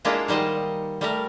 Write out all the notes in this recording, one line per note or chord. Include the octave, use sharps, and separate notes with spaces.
G#3 A#3 D4 E4 F4
D#3 G3 C5 D#5 F#5
G3 A3 A#4